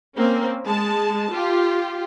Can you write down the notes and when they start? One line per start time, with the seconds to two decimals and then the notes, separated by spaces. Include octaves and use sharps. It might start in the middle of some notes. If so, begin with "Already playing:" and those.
0.15 A#3 C4 C#4
0.64 G#3 A5
1.32 F4 G4